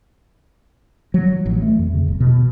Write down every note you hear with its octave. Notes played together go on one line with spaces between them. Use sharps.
F#3
A1
A3
F2
C#3
D#1
B2